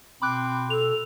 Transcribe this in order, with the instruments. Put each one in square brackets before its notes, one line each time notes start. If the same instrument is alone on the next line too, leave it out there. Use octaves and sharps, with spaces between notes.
[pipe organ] B2 [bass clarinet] C4 [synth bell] B5 D6 F#6
[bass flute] A4 [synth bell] F7